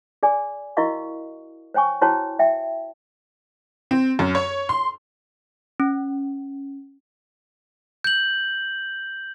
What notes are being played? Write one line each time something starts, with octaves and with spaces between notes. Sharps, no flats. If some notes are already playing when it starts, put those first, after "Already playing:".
G#4 D5 G#5
E4 F#4 A#4 D#5 F5 C#6
C5 C#5 G5 G#5 C#6
E4 F#4 C5 C#5 G5 A5
E5 G5
C4
F#2
C#5
C6
C#4
G6 F#7